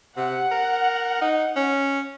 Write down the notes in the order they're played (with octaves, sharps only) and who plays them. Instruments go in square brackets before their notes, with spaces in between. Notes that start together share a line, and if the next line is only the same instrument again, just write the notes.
[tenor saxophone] C3 [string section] F#5
[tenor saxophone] A#4
D#4
C#4